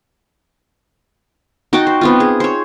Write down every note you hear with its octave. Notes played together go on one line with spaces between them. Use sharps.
D#4 F#4 G5 A5
C5
B3 C4 F4
G#4
C5 C#5